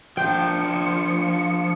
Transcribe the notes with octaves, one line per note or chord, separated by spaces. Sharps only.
F3 D4 G5 C#7